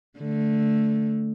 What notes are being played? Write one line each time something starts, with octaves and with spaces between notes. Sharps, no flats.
D3 A3